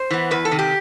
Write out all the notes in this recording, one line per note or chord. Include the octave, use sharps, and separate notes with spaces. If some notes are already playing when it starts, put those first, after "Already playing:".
Already playing: C5
E3 B3
E2 B4
A4
C3 D#3
G4